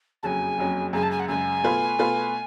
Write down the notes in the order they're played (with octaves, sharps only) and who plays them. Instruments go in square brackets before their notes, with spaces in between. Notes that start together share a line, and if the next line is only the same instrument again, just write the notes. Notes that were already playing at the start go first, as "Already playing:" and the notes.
[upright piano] F#1 F2 C#3 F#3 C#4 [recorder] G#5 A5
[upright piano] F#1 F2 C#3 F#3 C#4
[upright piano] F#2 C#3 G#3 [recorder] G#5
[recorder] A5
G#5
F#5
[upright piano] F#2 C#3 G#3 [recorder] G#5
[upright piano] B2 A3 F4 B4
B2 A3 F4 B4